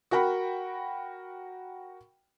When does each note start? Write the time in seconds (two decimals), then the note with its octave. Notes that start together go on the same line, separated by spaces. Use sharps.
0.11 F#4 A#4 F#5 G5 B5